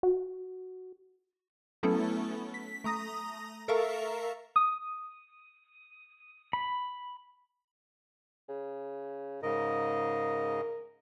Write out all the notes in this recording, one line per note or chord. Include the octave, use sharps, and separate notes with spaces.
F#4
F#3 A3 B3 C#4 E4 A4
B6
A3 A#5 D#6 A#6
A4 A#4 E5 F5 A#5 C#6
D#6
B5
C#3
G#2 C#3 A#4 D#5